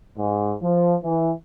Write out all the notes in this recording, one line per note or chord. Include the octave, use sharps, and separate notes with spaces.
G#2
F3
E3